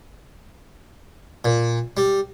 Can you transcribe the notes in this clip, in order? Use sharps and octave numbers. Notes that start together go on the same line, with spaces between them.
A#2
G3